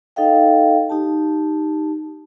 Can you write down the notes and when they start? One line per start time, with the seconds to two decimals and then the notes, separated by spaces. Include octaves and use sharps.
0.16 D#4 A4 D#5 F5 G5
0.90 D#4 G4 A5